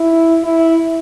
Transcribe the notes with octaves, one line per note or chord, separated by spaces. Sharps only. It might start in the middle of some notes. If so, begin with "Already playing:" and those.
Already playing: E4
E4